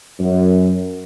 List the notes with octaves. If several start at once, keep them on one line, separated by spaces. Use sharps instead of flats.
F#2